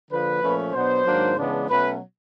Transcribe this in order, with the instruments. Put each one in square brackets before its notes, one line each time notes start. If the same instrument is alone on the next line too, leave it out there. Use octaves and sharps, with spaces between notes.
[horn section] D3 F3 A#3 B4
A#2 F3 A3 C#4
B2 F#3 B3 D4 C5
G#2 D#3 F#3 A#3 D4
C#3 E3 G#3 B3 D4
B2 F#3 A3 C#4 B4